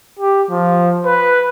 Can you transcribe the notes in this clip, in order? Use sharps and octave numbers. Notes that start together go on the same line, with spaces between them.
G4
F3
B4